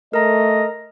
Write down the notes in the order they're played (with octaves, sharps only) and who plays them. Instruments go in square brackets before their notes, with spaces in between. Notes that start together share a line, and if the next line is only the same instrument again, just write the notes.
[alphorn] A3 [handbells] A#4 A#5 [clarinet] D#5